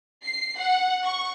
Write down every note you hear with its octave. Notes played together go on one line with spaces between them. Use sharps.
C7
F#5
C#6